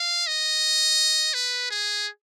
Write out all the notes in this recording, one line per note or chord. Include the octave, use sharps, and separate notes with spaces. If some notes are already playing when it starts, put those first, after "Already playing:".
Already playing: F5
D#5
B4
G#4